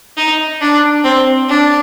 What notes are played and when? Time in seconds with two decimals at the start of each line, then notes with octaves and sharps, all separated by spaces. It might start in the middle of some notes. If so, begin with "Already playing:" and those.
0.17 D#4
0.61 D4
1.05 C4
1.49 D4